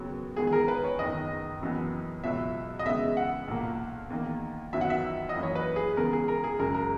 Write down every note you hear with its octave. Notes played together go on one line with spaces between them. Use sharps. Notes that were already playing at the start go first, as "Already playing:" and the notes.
Already playing: D#2 C#3 F#3 B3
E2 D#3 G#3 B3 G#4
G#4
A#4
B4
C#5
F#1 E2 D#3 D#5
F#1 F#2 E3 B3
C#2 B2 F#3 E5
D#5
E2 C#3 G#3 B3 E5
F#5
B1 A#2 A#3
E2 D#3 A#3
F#2 D#3 F#3 B3 E5
F#5
E5
D#5
F#2 E3 A#3
C#5
B4
G#4
E2 C#3 G#3 B3 A#4
G#4
A#4
G#4
F#1 F#2 C#3 G#3 A#4
A#4